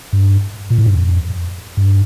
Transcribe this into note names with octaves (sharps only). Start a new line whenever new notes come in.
G2
A#2
A2
G2
F2
G2